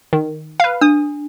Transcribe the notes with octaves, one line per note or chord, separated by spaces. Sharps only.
D#3
B4 F5
D4 D#6